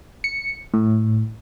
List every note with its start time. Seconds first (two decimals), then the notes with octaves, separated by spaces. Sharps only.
0.24 C#7
0.74 A2